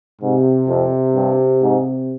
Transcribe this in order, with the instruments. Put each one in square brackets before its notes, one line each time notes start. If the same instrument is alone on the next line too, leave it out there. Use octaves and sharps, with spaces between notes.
[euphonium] G#2 [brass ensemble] C3
[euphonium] F2
G2
G#2